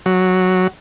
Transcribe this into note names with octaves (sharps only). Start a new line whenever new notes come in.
F#3